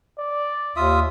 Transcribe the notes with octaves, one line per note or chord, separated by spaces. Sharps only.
D5
D#2 F4 E5 D#6